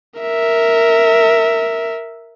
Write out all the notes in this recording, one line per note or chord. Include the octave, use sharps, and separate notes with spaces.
A#4 E5